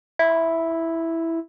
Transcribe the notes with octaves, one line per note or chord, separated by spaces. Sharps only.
E4